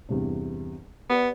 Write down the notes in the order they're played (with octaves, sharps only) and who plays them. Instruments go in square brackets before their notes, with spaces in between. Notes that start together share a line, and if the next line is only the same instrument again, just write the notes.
[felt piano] E2 G2 C3
[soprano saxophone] B3 [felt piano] G4 B4 D5